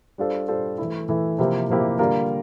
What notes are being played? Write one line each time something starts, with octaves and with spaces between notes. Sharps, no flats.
G3 D4 F4 A4 C5
G3 D4 F4 A4 C5
E3 A3 E4
E3 A3 E4
C3 F3 A#3 E4 G4
C3 F3 A#3 E4 G4
D3 G3 A#3 F4 A#4